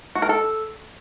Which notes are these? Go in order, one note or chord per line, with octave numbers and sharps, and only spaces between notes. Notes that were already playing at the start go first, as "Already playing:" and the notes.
F#4
A#4
A4